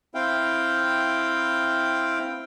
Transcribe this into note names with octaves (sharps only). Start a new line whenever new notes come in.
C4 E4 F5 G5